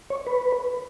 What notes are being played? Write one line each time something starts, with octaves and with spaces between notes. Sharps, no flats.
C#5
B4